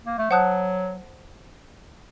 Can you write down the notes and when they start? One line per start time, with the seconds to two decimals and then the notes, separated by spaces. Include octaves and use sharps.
0.06 A#3
0.18 A3
0.31 F#3 C5 F#5 A5 D#6 F#6